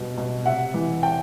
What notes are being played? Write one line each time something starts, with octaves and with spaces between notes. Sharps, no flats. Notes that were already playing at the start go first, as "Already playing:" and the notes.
Already playing: B2 G3
B2
C3 E5 F#5
E3
G5 A5